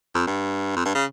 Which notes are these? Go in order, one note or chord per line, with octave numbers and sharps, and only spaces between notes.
F2
G2
F2
G2
C#3